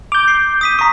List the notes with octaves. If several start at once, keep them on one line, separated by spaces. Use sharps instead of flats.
D6 G6 F7
C7
D#6 B6 D#7
A#5 C#6 D#6 B6